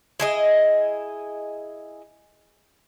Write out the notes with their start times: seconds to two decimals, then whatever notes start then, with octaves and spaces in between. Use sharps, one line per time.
0.20 E4 G#4 D#5